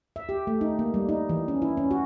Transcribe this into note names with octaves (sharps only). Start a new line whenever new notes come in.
E5
G4
A3
D#4
A#3
G3
D#4
E3
C#4
E4
C#4
F#4